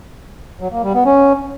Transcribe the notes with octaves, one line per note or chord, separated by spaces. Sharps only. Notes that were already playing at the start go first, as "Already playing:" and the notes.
F#3
A#3
G3
B3
C#4